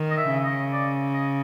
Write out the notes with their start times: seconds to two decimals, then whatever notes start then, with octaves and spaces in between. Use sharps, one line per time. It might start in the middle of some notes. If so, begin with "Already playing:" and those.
Already playing: D#3
0.10 D#5
0.17 E5
0.31 C#3
0.44 D#5
0.73 D5
1.14 D#5